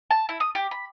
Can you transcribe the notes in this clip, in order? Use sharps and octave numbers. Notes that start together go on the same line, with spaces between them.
A5
E4
D#6
G4
B5